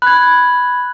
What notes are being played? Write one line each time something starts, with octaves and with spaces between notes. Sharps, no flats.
B5 F#6 G#6